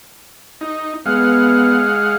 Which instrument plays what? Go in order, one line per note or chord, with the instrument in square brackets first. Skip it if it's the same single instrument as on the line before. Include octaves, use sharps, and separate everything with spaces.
[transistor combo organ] D#4
[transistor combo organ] G#3 F5 F#5 [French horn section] B3